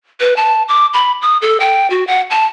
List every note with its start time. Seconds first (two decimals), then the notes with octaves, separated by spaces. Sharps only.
0.20 B4
0.36 A5
0.68 D6
0.93 B5
1.22 D#6
1.42 A4
1.60 G5
1.90 F#4
2.07 F#5
2.31 A5